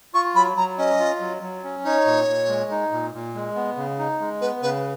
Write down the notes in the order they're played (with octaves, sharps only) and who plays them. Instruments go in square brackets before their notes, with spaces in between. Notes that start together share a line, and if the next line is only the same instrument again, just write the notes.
[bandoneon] F4 [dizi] C#6
[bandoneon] F#3 [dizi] B5
[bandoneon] F#3 [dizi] A#5
[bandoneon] C#4 [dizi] D#5
[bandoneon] F4
F#3
F#3
C#4
[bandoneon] D#4 [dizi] C#5
[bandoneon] A#2
A#2
G#3
D#4
A#2
A#2
G#3
B3
C#3
D#4
G#3
[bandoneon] B3 [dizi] B4
[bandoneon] C#3 [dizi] B4